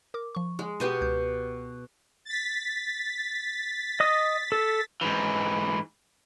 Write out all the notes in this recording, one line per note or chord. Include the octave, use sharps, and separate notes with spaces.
A#4 D6
F3 C#6
G#3
B2 B3 G4 D#7
C#2 G6
A6 B6
D#5 D#6
A4
G#2 E3